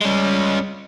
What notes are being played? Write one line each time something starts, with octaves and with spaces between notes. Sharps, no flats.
G3 G#3 C#4